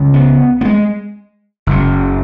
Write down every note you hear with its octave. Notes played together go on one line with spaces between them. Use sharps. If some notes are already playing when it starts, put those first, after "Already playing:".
Already playing: C#2 C#3
B3
B3
G#3
F#1 F#2 C#3